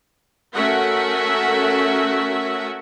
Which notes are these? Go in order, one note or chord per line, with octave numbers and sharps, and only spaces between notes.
A3 C#4 F#4 A#4 E5 F#5